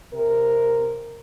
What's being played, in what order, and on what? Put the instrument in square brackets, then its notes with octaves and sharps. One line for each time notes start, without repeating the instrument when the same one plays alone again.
[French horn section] C3 A#4